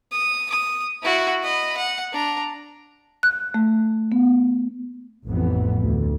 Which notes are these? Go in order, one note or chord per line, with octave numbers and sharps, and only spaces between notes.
D#6
D#6
E4 F#4
D#5 B5
F#5
D4 A#5
F#6
A3
B3
A1 F2 E3 B3
D2